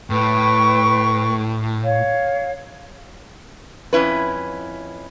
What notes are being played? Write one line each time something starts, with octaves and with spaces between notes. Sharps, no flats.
A2 B4 G5 C#6
C#5 F5
F2 C#4 E4 B4